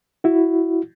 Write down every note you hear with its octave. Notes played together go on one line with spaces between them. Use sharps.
E4 F#4